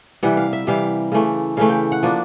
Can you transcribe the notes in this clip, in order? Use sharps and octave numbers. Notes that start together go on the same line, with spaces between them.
C3 E3 G3 F#5
F5
E5
C3 E3 G3 F5
C#3 E3 A3
C#3 E3 A3 F5
G5
F#5
F3 A#3 D4